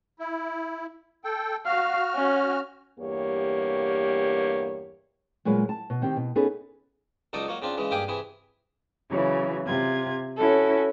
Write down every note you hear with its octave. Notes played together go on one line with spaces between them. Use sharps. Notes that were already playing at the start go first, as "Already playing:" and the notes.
E4
A4 G5
F#4 F5 F6
C#4
E2 G2 A#3 G4 C#5
A#2 F#3 G#3 F4 B4
A5
B2
D#3 C4 D#4 F#4 G4
B2
B3 C#4 D#4 G#4 A4 B4
C#2 F#3 D#4 A4 D5 D#6
F#3 A#3 C#5
C#3 C4 D4 F4
C#3 E3 G#3
G2 A#3 G4 G#4 G5 G#5
C3 E3 E4 G#4
C#3 E3 F#3
C3 F4 G#6
C#4 E4 F#4 A4